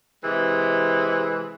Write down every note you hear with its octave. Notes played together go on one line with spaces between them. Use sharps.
C3 E3 G#3